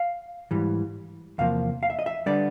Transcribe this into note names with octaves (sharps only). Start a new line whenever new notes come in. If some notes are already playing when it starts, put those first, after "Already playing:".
Already playing: F5
G#2 E3 G3
E2 C3 F3 A#3 F5
F5
E5
D#5
E5
D3 G3 B3 D5